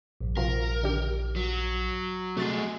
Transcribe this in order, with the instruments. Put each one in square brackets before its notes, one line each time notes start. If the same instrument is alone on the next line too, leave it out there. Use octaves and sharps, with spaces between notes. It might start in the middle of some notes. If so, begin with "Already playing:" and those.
[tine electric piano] A#1 G2
[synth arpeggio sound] C3 F3 F#3 [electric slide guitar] A#4
[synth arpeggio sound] D3 D#3 G4
[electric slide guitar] F#3
[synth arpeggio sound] C3 F#4 A6 [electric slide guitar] A3 G#4